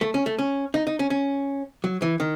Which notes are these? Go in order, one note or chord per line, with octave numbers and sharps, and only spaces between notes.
A3
C#4
A3
C#4
D#4
D#4
C#4
C#4
F#3
E3
D#3